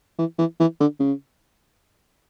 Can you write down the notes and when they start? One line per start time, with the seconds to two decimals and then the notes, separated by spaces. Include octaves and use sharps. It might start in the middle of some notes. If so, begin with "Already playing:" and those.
0.19 E3
0.38 E3
0.60 E3
0.80 D3
1.00 C#3